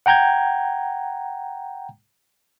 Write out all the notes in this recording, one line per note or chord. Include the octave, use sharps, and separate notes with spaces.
F#5 G5 A#5 G6 G#6